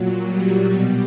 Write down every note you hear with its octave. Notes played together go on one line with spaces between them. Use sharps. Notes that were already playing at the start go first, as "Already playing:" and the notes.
Already playing: A#2 F#3
G3
B2